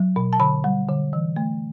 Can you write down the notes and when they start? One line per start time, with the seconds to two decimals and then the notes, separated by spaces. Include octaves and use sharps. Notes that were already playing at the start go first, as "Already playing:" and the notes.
Already playing: F#3
0.16 B2
0.33 A5
0.40 D3 B5
0.64 G3
0.89 D3
1.13 E3
1.36 A3